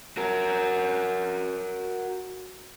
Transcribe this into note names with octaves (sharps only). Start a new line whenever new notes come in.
F#4 A#4